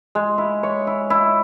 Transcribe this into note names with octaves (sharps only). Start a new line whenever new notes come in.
G#3
E4
C#5
E4
E4